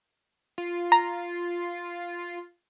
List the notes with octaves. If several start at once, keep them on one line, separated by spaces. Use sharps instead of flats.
F4
A#5